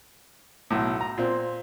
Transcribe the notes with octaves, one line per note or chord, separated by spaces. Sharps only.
B1 A2
A#5
A#2 C4